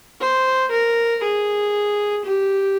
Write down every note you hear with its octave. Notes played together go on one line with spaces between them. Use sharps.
C5
A#4
G#4
G4